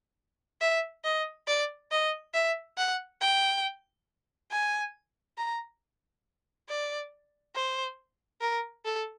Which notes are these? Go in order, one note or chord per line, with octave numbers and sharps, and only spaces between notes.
E5
D#5
D5
D#5
E5
F#5
G5
G#5
A#5
D5
C5
A#4
A4